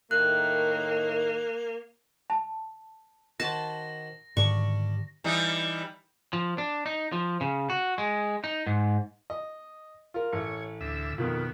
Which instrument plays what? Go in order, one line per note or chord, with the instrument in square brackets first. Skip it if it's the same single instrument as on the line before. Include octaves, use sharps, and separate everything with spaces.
[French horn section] A2 D#3 [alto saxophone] A#3 [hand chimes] F#6
[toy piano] A5
[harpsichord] D#3 F#4 C5 [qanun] A5 [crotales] A#6
[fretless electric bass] G#2 D3 D#3 [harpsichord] G3 D4 [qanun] C#6
[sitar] E3 G3 D#4
[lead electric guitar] F3
D4
D#4
F3
C#3
F#4
G#3
D#4
G#2
[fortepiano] D#5
F4 A#4
[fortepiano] A1 [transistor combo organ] C#5
[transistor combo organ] D2 E5
[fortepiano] F2 D#3 F3 [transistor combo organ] B2